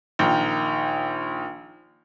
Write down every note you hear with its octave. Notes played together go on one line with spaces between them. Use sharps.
A#1 D#3 G5